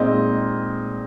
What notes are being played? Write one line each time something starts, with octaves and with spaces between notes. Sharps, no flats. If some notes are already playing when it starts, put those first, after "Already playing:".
Already playing: A#2 G#3 C4 D#4 D#5